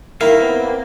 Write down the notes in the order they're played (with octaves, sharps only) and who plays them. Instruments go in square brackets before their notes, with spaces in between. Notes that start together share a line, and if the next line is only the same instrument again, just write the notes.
[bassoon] D#3 [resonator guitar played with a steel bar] A#3 [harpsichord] E4 [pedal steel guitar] F5
[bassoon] B3 [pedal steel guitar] C4